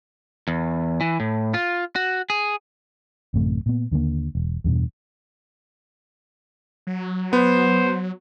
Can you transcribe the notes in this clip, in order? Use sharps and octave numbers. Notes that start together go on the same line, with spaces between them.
E2
E3
A2
F4
F#4
G#4
A1 F#2 C3 A3
A#2 B3
D#2 D3 G#3 A#3
E1
E2 G2 B2
F#3
B3 C5